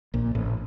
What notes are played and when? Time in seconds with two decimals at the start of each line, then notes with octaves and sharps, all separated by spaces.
0.14 A#1 A#2
0.35 A1 A2